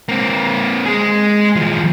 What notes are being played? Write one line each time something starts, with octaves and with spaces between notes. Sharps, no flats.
A#3 C4
G#3 G#4
D#2 F3